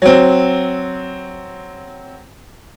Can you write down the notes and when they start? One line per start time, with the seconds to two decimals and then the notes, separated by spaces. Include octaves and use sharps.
0.02 F#3 C4